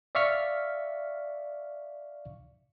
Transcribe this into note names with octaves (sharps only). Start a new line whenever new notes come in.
D5 E5 F5 C#6 F6 B6